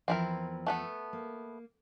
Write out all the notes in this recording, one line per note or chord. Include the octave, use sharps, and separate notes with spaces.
E2 F3 C4 E4 A#4
A3 B3 A4
A#3